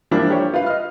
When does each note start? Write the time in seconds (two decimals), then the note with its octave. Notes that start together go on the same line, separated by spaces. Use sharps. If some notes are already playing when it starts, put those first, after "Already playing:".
0.11 E3 F3 G3 A#3 D4 E4
0.30 G4 C#5
0.54 F4 B4 F5
0.66 D#5 F6